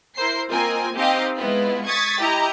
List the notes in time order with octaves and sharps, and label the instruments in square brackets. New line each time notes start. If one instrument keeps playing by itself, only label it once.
[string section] E4 A#4 C5 C7
A#3 C4 F4 A#4 D#5 G#5
C4 D#4 G4 D#5 F5
G#3 B3 E4 F4
C#6 D#6 G#6 A6 B6
E4 G4 D#5 A#5